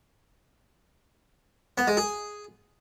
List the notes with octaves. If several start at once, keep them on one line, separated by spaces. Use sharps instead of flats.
B3
G#3
G#4